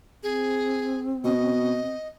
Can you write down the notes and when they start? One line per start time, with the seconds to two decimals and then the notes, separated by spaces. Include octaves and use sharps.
0.23 C4 G#4
1.24 B2 D#5